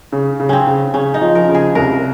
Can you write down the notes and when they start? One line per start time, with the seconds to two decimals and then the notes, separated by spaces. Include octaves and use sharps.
0.12 C#3
0.40 C#3
0.49 C4 C#4
0.67 C#3
0.94 C#3 C#4
1.14 D#4
1.21 F3
1.35 A#4
1.48 C#3
1.55 G#4
1.75 C2 A#4